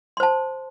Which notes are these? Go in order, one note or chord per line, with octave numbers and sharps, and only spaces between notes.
C5 A5 C6